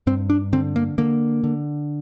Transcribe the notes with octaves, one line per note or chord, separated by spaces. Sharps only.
G2 C4
D4
D3 C4
A#3
D3 A#3
D3